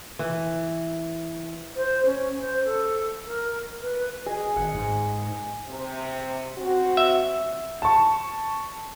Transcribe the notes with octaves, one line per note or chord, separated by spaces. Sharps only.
E3
C5
C#4
C5
A4
A#4
B4
G#4 D#5 G#5
G#1 F#5
G#2
C3
C4 F#4
E5
A5 C#6